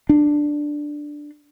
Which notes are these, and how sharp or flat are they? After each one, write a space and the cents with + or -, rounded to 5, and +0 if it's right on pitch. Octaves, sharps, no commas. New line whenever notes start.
D4 +5